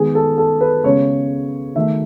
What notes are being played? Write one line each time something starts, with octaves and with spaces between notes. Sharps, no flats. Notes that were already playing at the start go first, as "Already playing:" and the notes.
Already playing: D#3 G#3 B3 G#4
A4
A4
B4
C#3 G#3 B3 C#5
D#3 A3 E5